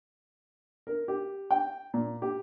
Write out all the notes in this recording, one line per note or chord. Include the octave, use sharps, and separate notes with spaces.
A#4
G4
G5
A#2
G4